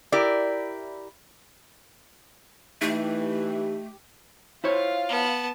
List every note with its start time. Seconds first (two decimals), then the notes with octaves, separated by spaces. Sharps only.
0.12 E4 G4 A#4 D5
2.82 E3 A3 D#4 G4
4.64 E4 F4 C5 C#5 F5
5.09 B3 A5